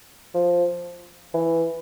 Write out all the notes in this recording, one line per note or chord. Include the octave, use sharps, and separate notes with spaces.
F3
E3